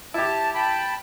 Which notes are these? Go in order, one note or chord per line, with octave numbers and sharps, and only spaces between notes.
E4 G4 A5
G5 A5 B5